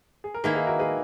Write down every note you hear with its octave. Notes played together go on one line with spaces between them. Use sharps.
G#4
A#4
D#3 A#3 E4 G#4 B4
G#4 B4
F#4 A#4
G#4 B4